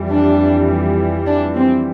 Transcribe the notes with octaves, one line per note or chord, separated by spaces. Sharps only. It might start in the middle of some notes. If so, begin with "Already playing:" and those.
Already playing: F2 E3 G3
D4
D4
C4